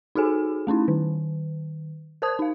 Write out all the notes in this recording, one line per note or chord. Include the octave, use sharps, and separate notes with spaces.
D#4 F#4 G#4 A4 G#5
A3 C#4 D#4 E4
D#3
A#4 C5 A5 D#6 G#6
D#4 F5